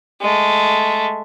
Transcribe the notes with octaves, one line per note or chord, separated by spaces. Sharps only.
G#3 A3